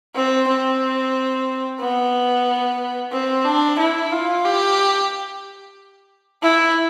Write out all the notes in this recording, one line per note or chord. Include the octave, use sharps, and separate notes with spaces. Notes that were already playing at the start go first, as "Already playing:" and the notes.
C4
C4
B3
C4
D4
E4
F4
G4
E4